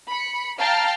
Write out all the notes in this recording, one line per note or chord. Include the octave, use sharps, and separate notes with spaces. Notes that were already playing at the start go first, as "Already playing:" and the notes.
B5 C#7
F5 G5 A5 A#5 F6